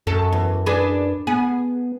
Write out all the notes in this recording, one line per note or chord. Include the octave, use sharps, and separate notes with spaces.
F#2 A4
E2
D4 G#4 B4
B3 G#4